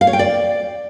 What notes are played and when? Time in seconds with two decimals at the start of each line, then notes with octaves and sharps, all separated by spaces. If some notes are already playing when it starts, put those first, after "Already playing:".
0.01 F5
0.07 C#5
0.13 G5
0.19 D5